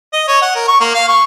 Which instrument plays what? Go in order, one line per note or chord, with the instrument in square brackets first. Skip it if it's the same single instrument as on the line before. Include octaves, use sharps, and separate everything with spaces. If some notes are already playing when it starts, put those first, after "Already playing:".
[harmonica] D#5
C#5
F#5
A#4
C#6
A#3
F5
C#6